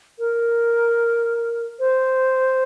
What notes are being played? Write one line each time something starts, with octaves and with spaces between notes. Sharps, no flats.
A#4
C5